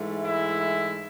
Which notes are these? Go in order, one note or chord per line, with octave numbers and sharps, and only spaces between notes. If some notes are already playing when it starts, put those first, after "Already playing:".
Already playing: G#2 E3 A3
E4